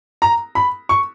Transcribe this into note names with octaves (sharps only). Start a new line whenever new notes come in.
A#5
B5
C#6